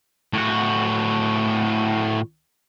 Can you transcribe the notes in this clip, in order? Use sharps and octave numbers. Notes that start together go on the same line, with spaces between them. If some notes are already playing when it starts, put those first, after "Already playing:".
A2 F#4